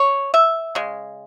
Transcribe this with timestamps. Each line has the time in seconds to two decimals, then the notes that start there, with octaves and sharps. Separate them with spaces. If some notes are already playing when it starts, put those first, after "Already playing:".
Already playing: C#5
0.34 E5
0.75 C#3 G#3